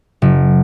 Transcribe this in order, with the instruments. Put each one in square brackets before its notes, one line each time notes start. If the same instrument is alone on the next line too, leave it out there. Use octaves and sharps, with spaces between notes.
[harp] F#1